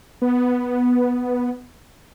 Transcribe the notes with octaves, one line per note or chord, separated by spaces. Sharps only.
B3